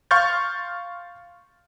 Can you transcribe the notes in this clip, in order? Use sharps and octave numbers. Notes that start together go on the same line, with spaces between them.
F5 C6 C#6 F6 G6 A6